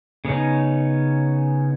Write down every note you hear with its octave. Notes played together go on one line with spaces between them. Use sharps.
C#3 B3 C#4 D#4